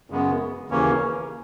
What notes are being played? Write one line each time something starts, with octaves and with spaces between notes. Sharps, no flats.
F#2 C#3 G#3 B3
D#2 C#3 E3 A#3 C#4